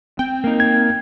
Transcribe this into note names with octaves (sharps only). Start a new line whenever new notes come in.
C4 G5
A#3 D#4
G#6